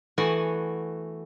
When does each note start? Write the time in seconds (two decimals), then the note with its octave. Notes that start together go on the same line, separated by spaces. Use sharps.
0.18 E3 A3 B3 F#4 F#5 G#5